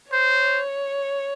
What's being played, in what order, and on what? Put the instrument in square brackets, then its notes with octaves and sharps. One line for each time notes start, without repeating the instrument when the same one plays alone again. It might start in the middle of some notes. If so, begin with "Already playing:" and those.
[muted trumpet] C5 [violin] C#5